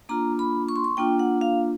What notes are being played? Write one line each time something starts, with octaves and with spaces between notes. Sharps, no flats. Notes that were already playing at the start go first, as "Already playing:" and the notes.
A#3 D4 F4 A#5
B5
C#6
C6
C#6
A#3 D4 F4 G5
F#5
F5